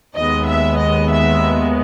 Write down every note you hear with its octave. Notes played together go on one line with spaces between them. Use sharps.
D#2 D#3 G#3 B3 D#5
E5
D#5
E5